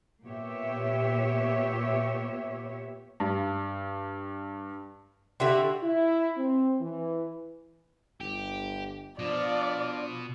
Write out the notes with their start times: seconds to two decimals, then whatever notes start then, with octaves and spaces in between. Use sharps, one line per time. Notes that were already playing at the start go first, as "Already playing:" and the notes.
0.24 A#2 B3 G4 C#5 E5
3.20 G2
5.40 D3 E4 F#4 G4 C6
5.82 E4
6.37 C4
6.80 E3
8.21 G1 G4
9.19 B2 F3 D4 F4 D5